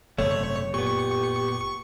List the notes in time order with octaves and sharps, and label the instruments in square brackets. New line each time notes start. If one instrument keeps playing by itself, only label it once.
[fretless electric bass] F#1 [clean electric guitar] G#2 C3 A3 [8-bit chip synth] C#5
[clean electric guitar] A#2 B3 [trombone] G4 [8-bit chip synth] C#6